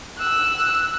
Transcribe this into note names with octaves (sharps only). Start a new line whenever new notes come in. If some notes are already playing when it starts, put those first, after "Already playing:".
E6 F#6